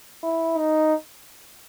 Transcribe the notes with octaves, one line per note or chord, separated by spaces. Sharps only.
E4
D#4